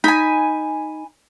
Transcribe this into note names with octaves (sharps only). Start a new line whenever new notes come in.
D#4 G#5 B5